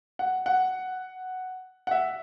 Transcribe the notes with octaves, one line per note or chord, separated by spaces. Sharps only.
F#5
F#5
F#5
E5